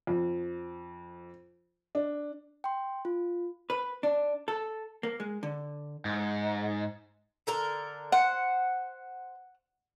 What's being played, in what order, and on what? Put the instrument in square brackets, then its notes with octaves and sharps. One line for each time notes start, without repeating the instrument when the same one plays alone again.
[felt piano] F2
D4
[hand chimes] G5 C6
F4
[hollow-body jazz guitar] B4
D4
A4
A#3
G#3
D3
[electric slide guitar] G#2
[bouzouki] D3 A4 A#4
[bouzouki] C5 [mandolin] F#5